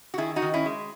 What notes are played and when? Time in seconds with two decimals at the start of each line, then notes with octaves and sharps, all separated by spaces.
0.14 F#4
0.18 D#3 E4 G#4
0.36 D#4 F#4
0.42 D#3
0.53 C#4 E4
0.66 G#3